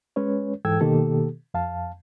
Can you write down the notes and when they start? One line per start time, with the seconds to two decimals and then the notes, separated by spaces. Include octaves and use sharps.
0.16 G#3 C#4 B4 C#5
0.65 G#2 E3 A4 G5 E6 G#6
0.81 B2 D#3 A#3 G4 A4
1.54 F2 F5 A5